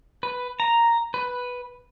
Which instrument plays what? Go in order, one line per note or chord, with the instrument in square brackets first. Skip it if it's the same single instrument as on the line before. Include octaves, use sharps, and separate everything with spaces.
[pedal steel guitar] B4
A#5
B4